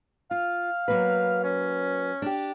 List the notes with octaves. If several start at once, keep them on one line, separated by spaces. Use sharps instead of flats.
F4 F5
F#3 A#3 B4
C#4
D4 G4